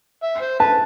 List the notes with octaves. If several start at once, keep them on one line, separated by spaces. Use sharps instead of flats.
E5
C5
B4 A5